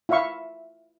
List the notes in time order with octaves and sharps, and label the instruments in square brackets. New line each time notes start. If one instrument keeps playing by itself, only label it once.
[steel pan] E4 F4 E5 F5 C#6